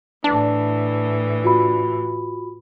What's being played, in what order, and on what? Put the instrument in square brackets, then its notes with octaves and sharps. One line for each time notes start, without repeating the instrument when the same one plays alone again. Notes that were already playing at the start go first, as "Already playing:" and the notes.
[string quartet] A2 E3 [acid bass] D4 [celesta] A5
[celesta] F4 F#4 B5